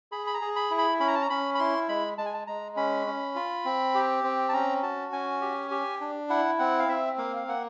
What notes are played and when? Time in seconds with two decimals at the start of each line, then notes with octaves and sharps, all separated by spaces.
0.12 G#4 B5
0.27 B5
0.34 A#5
0.42 G#4
0.56 B5
0.71 E4
0.78 B5
1.00 C#4 B5
1.08 A#5
1.15 A5
1.22 A#5
1.30 C#4 B5
1.55 B5
1.59 E4 C6
1.89 G#3 B5
2.18 G#3 A5
2.26 G#5
2.34 A5
2.47 G#3 A#5
2.77 C#4 B5
3.06 C#4
3.36 F4
3.65 C4
3.95 G4
4.24 C4
4.49 A5
4.53 C#4 A#5
4.83 F#4 A5
5.12 C#4 G#5
5.42 G4
5.71 G4
6.01 D4
6.30 E4 F#5
6.59 C4 F#5
6.80 F5
6.88 C4 E5
7.18 A#3 F5
7.36 F5
7.47 A#3 F#5